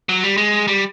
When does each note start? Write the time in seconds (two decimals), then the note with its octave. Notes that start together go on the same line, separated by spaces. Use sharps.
0.09 F#3
0.23 G3
0.37 G#3
0.68 G3